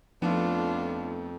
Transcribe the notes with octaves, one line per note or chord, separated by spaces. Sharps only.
F2 F3 A3 B3 D4 D#4 F4